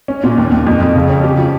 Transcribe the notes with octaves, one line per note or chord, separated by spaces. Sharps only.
C#4
A#2
D#2
D#2
F2
F2
C#3
C#4
G4
F3